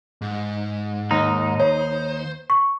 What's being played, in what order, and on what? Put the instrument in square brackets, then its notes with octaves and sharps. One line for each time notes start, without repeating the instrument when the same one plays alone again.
[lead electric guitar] G#2
[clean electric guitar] D#2 D#4
[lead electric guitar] C5 [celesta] C#5
[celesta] C#6